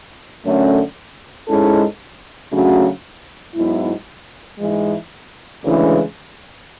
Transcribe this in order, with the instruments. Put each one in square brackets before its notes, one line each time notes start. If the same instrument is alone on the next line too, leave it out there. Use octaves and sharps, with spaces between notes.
[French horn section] F#2 D3 A3 C#4
G#2 G#3 C#4 E4 A4
C#3 F#3 A3 D4 F#4
G#2 F#3 B3 E4
G#2 E3 G#3
D2 C#3 E3 G#3